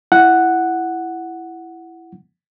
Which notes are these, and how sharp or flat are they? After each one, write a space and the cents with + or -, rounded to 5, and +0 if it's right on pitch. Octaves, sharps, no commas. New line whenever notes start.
E4 +10 F#5 +0